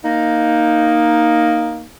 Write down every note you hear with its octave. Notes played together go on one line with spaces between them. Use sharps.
A#3 D#4